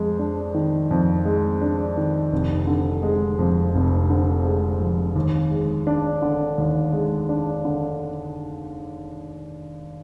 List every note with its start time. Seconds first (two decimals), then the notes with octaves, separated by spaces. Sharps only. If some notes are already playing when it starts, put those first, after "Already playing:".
Already playing: F2 G#3
0.19 D4
0.54 D#3
0.91 F2
1.25 G#3
1.61 D4
1.97 D#3
2.32 F1
2.67 D3
3.03 G#3
3.39 F2
3.75 F1
4.10 D3
4.44 G#3
4.81 F2
5.16 D#2
5.51 G#3
5.87 D4
6.22 D3
6.58 D#2
6.93 G#3
7.29 D4
7.65 D3